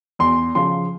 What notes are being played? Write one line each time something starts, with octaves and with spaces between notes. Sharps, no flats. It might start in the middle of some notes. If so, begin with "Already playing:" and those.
E2 C6
C#3 F3 C6